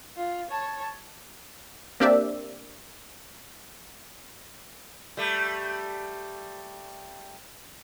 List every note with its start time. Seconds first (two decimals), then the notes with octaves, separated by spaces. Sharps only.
0.16 F4
0.51 C#5 A5
2.00 A#3 C4 D4 G4 D5 E5
5.17 G3 A3